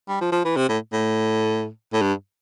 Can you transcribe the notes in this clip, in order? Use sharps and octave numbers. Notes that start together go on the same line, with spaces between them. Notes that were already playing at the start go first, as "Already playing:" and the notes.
G3
F3
F3
E3
C3
A2
A2
A2
G2